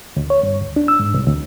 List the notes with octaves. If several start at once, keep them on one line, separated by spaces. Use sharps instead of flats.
D2
C#5
G2
D2
D4
E6
G#2
C2
D2